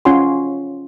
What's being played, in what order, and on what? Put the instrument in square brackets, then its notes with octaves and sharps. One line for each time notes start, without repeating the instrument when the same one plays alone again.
[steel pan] C#4 F4 C#5 F#5 G#5 C6